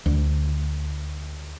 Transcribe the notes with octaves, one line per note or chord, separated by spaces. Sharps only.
D2